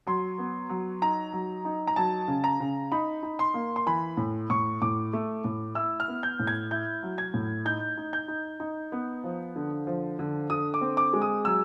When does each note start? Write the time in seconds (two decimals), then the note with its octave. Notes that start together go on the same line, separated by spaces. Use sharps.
0.07 F#3 C6
0.38 B3
0.69 F#3
1.02 D#4 A#5
1.33 F#3
1.65 D#4
1.87 A#5
1.96 F#3 A5
2.28 C#3
2.44 A#5
2.60 C#3
2.92 D#4 B5
3.23 D#4
3.39 C6
3.54 A#3
3.76 C6
3.86 E3 B5
4.17 A2
4.50 A2 C#6
4.82 A2 D6
5.13 A3
5.44 A2
5.75 E4 E6
6.00 F6
6.08 B3
6.23 G6
6.39 A2
6.47 G#6
6.71 E4 G6
7.03 F#3
7.18 G#6
7.34 A2
7.65 D#4 G6
7.97 D#4
8.13 G6
8.28 D#4
8.60 D#4
8.92 B3
9.24 F3
9.56 D3
9.87 F3
10.19 D3
10.50 D3 D#6
10.74 D6
10.81 C4
10.97 D6
11.13 G#3
11.22 D#6
11.45 F#3 E6